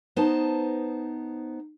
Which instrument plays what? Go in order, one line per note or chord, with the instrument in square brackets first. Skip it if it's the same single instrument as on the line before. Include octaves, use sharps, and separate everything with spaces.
[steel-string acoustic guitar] B3 D#4 C5 A5